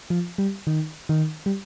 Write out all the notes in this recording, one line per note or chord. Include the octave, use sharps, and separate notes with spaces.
F3
G3
D#3
D#3
G3